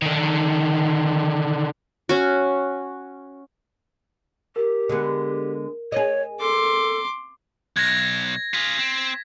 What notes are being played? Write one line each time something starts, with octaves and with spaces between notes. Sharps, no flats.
D3 D#3
C#4 F#4
G4 A#4
D3 G#3 B3
G#4 C#5 D#5
A4 C6 D6
B1 G#6 A#6
F4 G#4 B6
C4